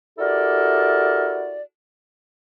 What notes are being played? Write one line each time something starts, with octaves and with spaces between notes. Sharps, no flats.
E4 F#4 G4 A4 A#4 D5